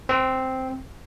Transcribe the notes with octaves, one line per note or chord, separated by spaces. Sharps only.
C4